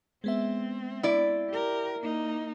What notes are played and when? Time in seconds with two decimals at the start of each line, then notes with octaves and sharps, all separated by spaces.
0.24 G#3 B3 C4 E5
1.03 E4 D5
1.50 G4 A#4
1.99 A#3 D#4